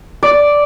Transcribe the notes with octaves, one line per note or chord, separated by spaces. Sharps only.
D5